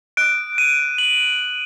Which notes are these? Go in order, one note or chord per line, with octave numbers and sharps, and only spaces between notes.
D#6 F#6 D7
D#7
F#7